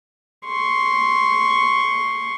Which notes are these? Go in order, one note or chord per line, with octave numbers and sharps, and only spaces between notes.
C6 C#6